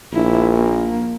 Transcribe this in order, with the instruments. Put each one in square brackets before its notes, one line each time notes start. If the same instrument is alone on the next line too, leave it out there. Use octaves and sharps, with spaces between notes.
[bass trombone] A#1 [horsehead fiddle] E4
[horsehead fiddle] A#3